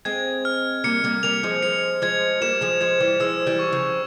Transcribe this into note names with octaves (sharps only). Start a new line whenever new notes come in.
G#3 C4 G#6
F6
G3 A#3 C#7
G3 A#3
G3 A#3 F7
F3 G#3
F3 G#3 C#7
F3 G#3 G#6
G3 A#3 E7
F3 G#3
F3 G#3 G#6
E3 G3
F3 G#3 E6
E3 G3
C#6
C#3 F3